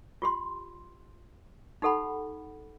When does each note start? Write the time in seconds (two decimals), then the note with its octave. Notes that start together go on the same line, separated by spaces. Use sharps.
0.22 F4 G4 C6
1.82 D#4 G4 A4 F#5 B5